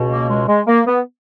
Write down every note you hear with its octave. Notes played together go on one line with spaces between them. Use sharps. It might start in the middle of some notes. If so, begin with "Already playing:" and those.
Already playing: C#2 B2
A#3
G#3
G#3
A#3
B3